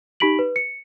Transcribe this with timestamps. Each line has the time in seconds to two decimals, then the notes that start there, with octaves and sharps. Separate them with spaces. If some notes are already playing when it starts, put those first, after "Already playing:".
0.20 D#4 G4 B5 B6 D7 F#7
0.39 B4
0.56 C#7